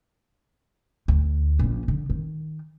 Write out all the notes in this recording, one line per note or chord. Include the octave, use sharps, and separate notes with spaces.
D2
A#1 C#4
D3
D#3